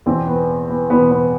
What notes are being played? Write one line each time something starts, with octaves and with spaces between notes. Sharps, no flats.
E2 B2 C4
B3
B3
E2 B2 B3
B3